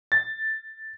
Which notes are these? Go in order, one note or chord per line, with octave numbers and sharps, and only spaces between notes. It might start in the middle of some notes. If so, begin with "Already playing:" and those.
A6